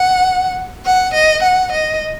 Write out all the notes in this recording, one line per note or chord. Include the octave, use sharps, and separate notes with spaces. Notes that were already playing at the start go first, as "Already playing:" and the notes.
Already playing: F#5
F#5
D#5
F#5
D#5